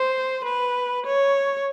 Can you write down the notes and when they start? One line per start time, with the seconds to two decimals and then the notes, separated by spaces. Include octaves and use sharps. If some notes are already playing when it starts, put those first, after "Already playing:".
Already playing: C5
0.45 B4
1.06 C#5